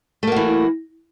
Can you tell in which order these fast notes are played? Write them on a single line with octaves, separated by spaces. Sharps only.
A3 A#3 F#4 E3